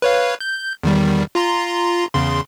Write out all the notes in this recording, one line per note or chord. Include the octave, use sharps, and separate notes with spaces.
B4 C#5 F5
G6
E2 D#3 G3
F4 A#5 C6
E2 C#3 C6